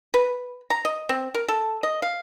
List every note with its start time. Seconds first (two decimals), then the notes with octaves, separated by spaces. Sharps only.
0.14 B4
0.70 A#5
0.85 D#5
1.09 C4
1.34 A#4
1.48 A4
1.83 D#5
2.02 F5